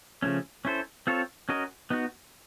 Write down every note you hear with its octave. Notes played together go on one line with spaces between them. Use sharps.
C#3 F3 A3 C#4
C#4 E4 A4 C5
C4 F4 A4 C#5
C#4 F#4 A#4 D#5
B3 D#4 F#4